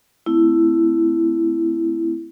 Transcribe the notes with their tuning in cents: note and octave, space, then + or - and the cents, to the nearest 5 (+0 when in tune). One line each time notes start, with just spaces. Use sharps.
A3 +0 C4 -25 E4 +10